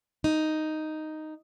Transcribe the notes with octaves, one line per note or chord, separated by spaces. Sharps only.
D#4